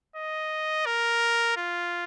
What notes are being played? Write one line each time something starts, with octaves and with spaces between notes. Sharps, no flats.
D#5
A#4
F4